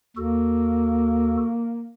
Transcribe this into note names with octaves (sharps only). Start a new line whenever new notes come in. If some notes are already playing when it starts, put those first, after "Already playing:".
D#2 A#3 F#4 A4